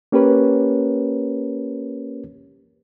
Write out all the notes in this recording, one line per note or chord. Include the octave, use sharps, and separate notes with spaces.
A#3 C#4 G4 A#4 B4 C#5